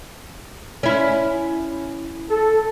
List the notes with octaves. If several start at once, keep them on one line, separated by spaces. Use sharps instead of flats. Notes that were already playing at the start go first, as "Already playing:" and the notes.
C#4 E4
A4